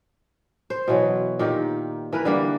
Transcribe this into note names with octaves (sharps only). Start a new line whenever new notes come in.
C5
B2 E3 F#3
A#2 D#3 G4
E3 A#4 B4
D3 G3 A#3